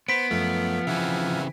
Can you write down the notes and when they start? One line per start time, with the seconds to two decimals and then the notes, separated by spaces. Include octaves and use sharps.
0.08 B3 C5 B6 D7
0.31 F#2 F3 A3
0.87 C#3 E3 C4 E5 F#5 G#5